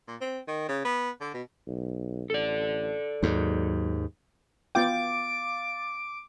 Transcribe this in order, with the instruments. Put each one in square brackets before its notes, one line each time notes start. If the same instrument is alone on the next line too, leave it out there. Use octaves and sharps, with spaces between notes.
[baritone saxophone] A#2
C4
D#3
C#3
B3
D3
B2
[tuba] B1
[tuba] A1 [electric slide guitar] A4 D5
[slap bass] D#2 G#2 [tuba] F#3
[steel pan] B3 F4 G5 [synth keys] F5 A6 [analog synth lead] D6